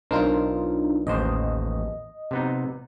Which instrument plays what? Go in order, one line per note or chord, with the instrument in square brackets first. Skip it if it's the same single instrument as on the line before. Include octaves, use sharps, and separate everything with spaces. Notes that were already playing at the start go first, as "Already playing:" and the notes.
[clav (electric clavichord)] B1 A#4 C5 [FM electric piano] D4 D#4 F4
[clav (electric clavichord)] A1 D#2 C5 [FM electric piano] D#5
[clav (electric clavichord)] C3 B3 D#4